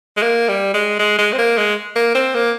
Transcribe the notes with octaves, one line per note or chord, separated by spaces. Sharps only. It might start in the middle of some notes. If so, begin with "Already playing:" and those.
G#3
A#3
G3
G#3
G#3
G#3
C4
A#3
G#3
A#3
C4
A#3